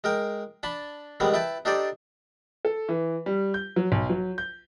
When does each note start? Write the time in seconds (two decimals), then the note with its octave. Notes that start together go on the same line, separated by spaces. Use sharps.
0.04 G#3 A#4 G5
0.63 D4 A5 B5
1.20 D#3 G3 G#3 B3 C4
1.34 E4 B4 G5 A5
1.65 D4 D#4 G4 A4 C5 D5
2.65 A4
2.89 E3
3.26 G3
3.54 G6
3.76 F#3
3.92 B1
4.10 F#3
4.38 G6